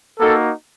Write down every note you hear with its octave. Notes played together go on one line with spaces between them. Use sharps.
A#3 D#4 F#4 A4